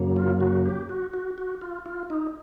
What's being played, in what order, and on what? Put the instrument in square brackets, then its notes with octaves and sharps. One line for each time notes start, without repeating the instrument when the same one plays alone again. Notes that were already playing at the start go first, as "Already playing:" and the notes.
Already playing: [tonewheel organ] F#2 C#3 F#3 A#3
F4
F#4
G4
F#4
F#4
F#4
F4
F4
D#4